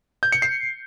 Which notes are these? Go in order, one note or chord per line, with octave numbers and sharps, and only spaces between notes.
G6
C#7
C7